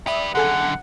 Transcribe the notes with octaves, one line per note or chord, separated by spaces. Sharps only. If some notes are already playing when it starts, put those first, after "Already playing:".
G4 B4 D5 E5 D#6
F#2 D3 G#4 A4 F#5 G#5